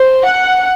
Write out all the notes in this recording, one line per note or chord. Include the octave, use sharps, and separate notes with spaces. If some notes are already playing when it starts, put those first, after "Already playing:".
Already playing: C5
F#5